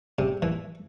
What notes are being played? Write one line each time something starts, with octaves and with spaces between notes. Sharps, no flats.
C3
E3